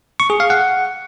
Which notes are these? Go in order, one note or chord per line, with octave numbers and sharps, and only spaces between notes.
C#6
G#4
F5
F#5